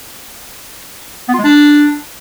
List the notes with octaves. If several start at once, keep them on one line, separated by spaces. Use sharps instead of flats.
B3
F4
G#3
D4